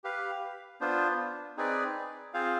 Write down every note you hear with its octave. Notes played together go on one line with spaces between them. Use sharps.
G4 B4 F5
B3 D4 F4 C5
C4 D#4 G#4 B4 D5
C4 F4 G#4 C5 F5